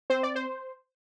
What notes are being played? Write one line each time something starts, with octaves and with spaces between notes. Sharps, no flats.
C4 C5
D5
C5